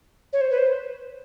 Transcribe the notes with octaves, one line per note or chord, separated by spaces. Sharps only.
C#5
C5
B4
C5